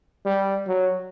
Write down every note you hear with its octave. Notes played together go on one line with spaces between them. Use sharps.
G3
F#3